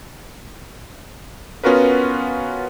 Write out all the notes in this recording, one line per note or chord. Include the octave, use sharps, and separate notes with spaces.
B3 C#4 F4 F#4 A#4 B4